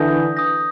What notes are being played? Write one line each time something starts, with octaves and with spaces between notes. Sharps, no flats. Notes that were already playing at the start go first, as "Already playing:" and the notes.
Already playing: D3 E3 D#6 G6 A#6
D#6 G6 A#6